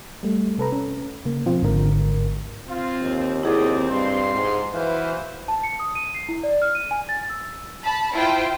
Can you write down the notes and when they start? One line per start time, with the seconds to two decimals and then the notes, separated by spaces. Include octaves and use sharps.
0.23 G3 A3
0.58 C3 A4 B4 A#5
0.72 C#4
1.25 C#3 A#3
1.46 B2 F3 C4 F4
1.62 G#1 G#2 D3 A#4
2.68 C4 F4
3.01 D#2
3.43 C4 E4 F#4 G#4 D5 D#5
3.90 G2 F4 C6
4.34 G#2
4.74 E3 F#4 B4 C5 F5
5.48 A5
5.64 C#7
5.80 D#6
5.95 D#7
6.15 C7
6.29 E4
6.43 D5
6.62 F6
6.75 D#7
6.91 G#5
7.09 A6
7.30 E6
7.81 A5 B5
8.13 E4 F4 C5 G5